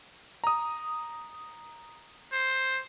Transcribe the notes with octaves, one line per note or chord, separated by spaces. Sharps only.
A#5 D#6
C5